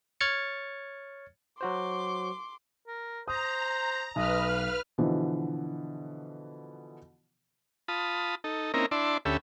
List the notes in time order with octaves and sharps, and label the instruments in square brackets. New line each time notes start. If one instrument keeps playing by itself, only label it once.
[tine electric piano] C#5 F6 G#6 A6 C#7
[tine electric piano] F#3 F#4 C5 [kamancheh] C6 D6
[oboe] A#4
[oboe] C5 [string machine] A#5 [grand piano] D#6
[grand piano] B1 [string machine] B4 F6 [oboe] D#5
[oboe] F5
[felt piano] B2 D3 E3 F3
[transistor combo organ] F4 A5 B5 D#6
D#4 A4
A#3 C4 C#4 D#4 E4 A#4
D4 E4 D5 A5 C6
D2 C#4 G4 A4 E5 B5